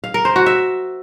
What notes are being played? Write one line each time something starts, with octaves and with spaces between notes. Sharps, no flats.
F5
A#4
C5
F#4
E5